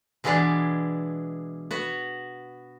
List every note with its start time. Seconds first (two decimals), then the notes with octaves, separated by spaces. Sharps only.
0.24 B2 E3 G#3 B3 D4 G#4
1.71 B3 F#4